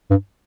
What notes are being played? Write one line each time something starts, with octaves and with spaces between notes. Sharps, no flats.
G2